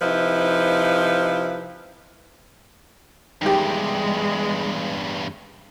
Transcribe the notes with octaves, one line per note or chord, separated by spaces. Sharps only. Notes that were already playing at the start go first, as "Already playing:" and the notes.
C3 F3 D#4 E4 B4
E2 G2 D#3 G#3 G4